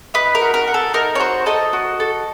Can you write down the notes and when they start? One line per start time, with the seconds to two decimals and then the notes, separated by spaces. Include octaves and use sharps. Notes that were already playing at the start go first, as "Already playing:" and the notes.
0.14 D#4 B4
0.35 A#4
0.41 F#4
0.54 A#4
0.68 F#4
0.74 A4
0.93 D#4 A#4
1.15 C#5
1.20 F#4 C5
1.46 A4 D#5
1.73 F#4
2.00 A4